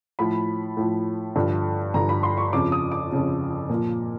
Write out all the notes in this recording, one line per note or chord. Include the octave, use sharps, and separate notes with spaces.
A2 F3 B5
A2 F3
G2 D3 F3
G2 D3 F3 A#5
B5
C6
C#6
F2 C#3 F3 D6
D#6
D6
F2 C#3 F3
A#2 F3